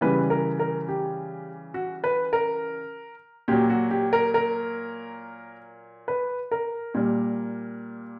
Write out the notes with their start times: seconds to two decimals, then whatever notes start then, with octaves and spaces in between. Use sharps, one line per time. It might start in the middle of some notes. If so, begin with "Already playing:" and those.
0.01 C#3 E3 G3 B4
0.30 A#4
0.59 A#4
0.89 G4
1.74 F#4
2.04 B4
2.33 A#4
3.48 A#2 F#3 G4
3.70 F#4
3.91 G4
4.13 A#4
4.34 A#4
6.08 B4
6.51 A#4
6.94 A#2 G3